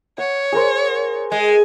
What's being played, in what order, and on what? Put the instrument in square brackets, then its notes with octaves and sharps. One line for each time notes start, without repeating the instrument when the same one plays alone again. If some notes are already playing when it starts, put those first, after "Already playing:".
[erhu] C#5 [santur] F#5
[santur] G#4 A#4 C5
[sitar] G#3 [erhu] G#5